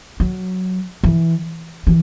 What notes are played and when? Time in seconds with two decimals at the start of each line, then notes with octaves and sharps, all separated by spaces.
0.20 F#3
1.03 E3
1.87 E3